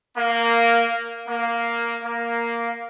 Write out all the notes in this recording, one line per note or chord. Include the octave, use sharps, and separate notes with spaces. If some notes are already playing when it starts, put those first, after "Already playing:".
A#3
A#3
A#3